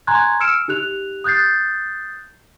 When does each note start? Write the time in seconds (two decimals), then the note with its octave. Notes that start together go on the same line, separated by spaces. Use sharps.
0.07 G#5 A#5 C6 C#6 F#6 G#6
0.40 E6 F6 C#7 D7 E7
0.68 D#4 G4 F#6 F7
1.24 D#6 F#6 G6 A6 C7